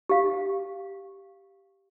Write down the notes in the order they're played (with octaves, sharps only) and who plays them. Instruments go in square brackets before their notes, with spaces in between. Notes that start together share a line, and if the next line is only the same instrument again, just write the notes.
[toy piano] G4 F5